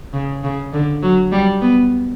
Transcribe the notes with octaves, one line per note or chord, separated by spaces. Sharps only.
C#3
C#3
D3
F#3
G3
B3